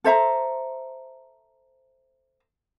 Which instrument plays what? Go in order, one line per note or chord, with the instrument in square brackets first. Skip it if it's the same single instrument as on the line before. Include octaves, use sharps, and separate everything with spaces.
[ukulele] A4 C5 E5 A#5